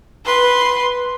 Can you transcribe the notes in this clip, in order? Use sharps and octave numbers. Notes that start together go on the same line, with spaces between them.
B4 C6